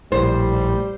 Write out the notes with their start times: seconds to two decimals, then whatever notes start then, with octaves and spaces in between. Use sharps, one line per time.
0.12 A#1 A2 G3 C5